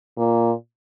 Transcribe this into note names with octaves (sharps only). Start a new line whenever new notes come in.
A#2